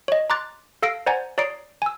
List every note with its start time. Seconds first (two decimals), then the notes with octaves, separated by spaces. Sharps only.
0.08 C#5 D#5
0.30 A#5 C6 D6 F#6 A6
0.83 A4 F5 E6 A#6 C7 D7
1.06 C5 D5 F#5 G#5 A#5 G#6
1.38 C#5 D5 A#5 D#6 C7 D7
1.82 G#5 E6